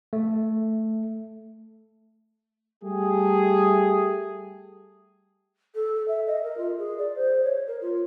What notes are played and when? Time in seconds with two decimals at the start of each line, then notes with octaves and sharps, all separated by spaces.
0.13 A3
2.83 G3 A3 G4 G#4
5.75 A4
5.95 A4
6.08 E5
6.27 D#5
6.43 A#4
6.58 F4
6.78 G#4
6.98 D5
7.16 C5
7.43 C#5
7.67 A#4
7.82 F4